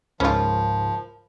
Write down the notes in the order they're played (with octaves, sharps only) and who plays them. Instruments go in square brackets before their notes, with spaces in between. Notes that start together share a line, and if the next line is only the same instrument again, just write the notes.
[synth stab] C#2 G#2 [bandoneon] F3 [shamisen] C#4 F4 [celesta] A#4 C5 B5